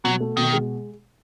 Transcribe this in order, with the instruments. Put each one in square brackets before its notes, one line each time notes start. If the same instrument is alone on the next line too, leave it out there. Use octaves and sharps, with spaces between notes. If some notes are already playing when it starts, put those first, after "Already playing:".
[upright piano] B2 [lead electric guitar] F#3
[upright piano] A3
[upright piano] B2 [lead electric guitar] D#3
[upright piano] G#3